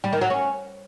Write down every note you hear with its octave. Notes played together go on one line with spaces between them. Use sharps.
G3
D#3
F#3
C#4